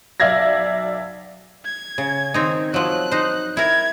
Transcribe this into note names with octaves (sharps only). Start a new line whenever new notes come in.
B1 D5 E5 F5 G#6 A#6
G#6
C#3
D#3 C4 D#4
F3 F#3 F#6
D#4 C5
E4 A#4 E5 G#6